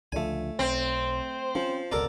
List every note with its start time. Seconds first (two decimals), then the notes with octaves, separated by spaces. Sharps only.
0.12 C#2 D3 F3 A3 G#5
0.59 B1 C4 C5
1.55 F3 C#4
1.92 G1 C#2 B2 A4 A#4 D5